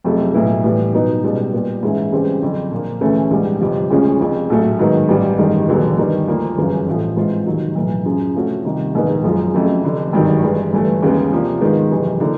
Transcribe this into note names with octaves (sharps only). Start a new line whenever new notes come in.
F#1 F2 C3 F3 A3
B1 A2 F#3 B3 E4
A2 E3 G3 B3
B2 F#3 B3 D#4
C#2 B2 G3
A#2 G3 B3
G#2 E3 G#3 C#4 E4
C#2 C#3 E3 G3 C4
F#1 F2 D3
A#2 F3 A#3
D2 C#3 E3 A3 C#4
A#1 G#2 E3 G3 B3
G1 F2 C3 F3
D2 C#3 F3 G#3 C#4
F1 F2 C#3
A#1 A2 F#3 A3
G#2 D#3 F#3 B3
A1 G2 E3 G3
A1 G2 D#3 G#3
E1 D#2 D3 F#3 B3
G2 D#3 G3 B3
D2 D3 F3 A#3
G1 F#2 C#3 E3
A1 A2 F3 A3
G#2 E3 G#3 C4 F4
F1 D#2 D#3 F#3
B1 A2 E3
F#2 C#3 F3
C3 F3 A3 C#4 F#4
C2 C3 D#3
A#1 G#2 D#3 G#3 B3
F#1 F#2 C#3 F3 G#3
F2 C#3 F#3 A3
F1 F2 D3
G#1 G2 D#3 F#3
G2 E3 G#3
G1 G2 E3 A3
D#2 C#3 E3 G#3 B3
C3 F3 A#3 D4
G#2 D#3 G#3 B3
F#1 F2 C3 E3
D3 F3 A#3 D#4